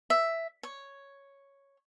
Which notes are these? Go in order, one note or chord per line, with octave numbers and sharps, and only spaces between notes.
E5
C#5